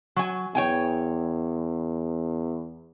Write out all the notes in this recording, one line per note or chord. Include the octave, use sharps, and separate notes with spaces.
F#3 G#5
E2 C#5 G5 G#5